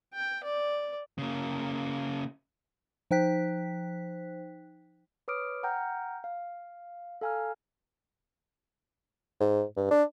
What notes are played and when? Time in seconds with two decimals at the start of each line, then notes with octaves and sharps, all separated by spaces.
0.14 G5
0.44 D5
1.18 C#3 A#3
3.11 F3 D#4 C5 G5 F#6 B6
5.28 B4 C#5 D6 D#6 F6 D7
5.63 F#5 G5 A#5 F6 G6
6.24 F5
7.21 A4 F5 G#5 A#5 F6
9.41 G#2
9.77 G2
9.91 D4